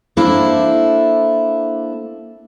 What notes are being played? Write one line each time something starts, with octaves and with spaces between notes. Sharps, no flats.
A#3 D4 E4 A4 C5